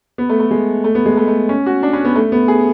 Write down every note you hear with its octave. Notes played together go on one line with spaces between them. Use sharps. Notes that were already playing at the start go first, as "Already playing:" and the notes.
B3
A3
A3
G#3
A3
B3
G#3
A3
A3
C#4
F#4
D4
C#4
B3
A3
B3
G#4